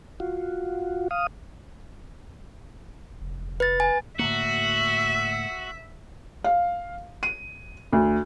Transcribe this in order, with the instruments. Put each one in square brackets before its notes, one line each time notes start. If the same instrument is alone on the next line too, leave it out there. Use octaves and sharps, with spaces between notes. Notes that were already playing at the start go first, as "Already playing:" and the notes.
[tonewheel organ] F4 F#4
F5 D#6
[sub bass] F1
[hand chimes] B4 A6
G#5
[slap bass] A2 D3 A#3 [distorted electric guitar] F#4 [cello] E5
[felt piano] F5
D#7
D2